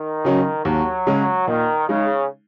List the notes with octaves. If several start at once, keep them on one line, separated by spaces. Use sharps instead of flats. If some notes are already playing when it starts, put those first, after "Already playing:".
Already playing: D#3
C#3 F#3 C#4
D#2 F#3
C#3 G#3 C#4
A#2 D#3
C#3 G#3 D#4